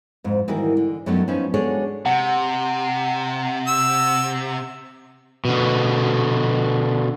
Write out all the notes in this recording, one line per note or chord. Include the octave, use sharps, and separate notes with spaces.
F2 G#2
D#3 E3 G3 F#4 A#4
D3
F#2 F#3 G3 A3 B3 D#4
F3 B3 C#4 D#4
G#3 D4 F#4 G#4 A4 C#5
C3 F#5
E6
B2 D3